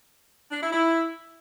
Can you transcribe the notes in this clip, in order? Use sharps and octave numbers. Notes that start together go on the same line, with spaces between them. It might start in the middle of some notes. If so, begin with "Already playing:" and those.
D4
E4
E4